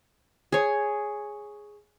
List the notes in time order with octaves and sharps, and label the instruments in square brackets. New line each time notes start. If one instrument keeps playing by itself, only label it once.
[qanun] G#4 C#5